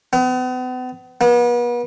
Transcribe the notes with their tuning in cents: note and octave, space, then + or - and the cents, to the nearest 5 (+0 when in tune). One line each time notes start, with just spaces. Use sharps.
B3 +40
B3 -40